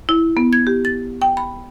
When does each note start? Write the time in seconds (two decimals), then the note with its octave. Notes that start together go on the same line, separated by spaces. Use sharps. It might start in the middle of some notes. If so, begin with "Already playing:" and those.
0.09 E4
0.37 B3
0.53 G#6
0.67 G4
0.85 A6
1.22 G5
1.37 B5